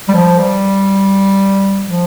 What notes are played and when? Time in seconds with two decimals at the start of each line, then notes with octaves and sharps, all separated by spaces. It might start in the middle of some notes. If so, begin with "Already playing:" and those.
0.09 G3
0.14 F3
0.39 G3
1.87 F3